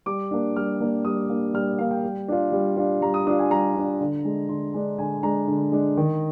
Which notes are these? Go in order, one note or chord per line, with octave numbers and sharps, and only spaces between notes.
G3 D6
A#3 D4
G3 F6
A#3 D4
G3 D#6
A#3 D4
G3 F6
A#3 D4 F5
G5
G3
D4 F4
G3
D4 F4
G3 A#5
D#6
D4 F4 D#6
G#5
G3 A#5
D4 F4
D3
G#3 D4
D3 C6
G#3 D4
D3 G#5
G#3 D4 A#5
D3
G#3 D4
D#3